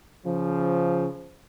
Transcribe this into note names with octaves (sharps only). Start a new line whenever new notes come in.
C#3 F3